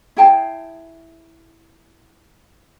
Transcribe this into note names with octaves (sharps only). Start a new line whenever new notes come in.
E4 G#4 G5 A5